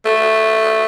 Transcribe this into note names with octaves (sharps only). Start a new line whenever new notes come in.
A3